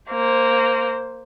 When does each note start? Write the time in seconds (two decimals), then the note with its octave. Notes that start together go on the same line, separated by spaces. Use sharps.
0.11 A#3 C5